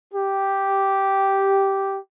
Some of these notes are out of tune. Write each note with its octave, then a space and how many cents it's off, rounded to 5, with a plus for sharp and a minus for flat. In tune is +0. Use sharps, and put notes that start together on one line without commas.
G4 -5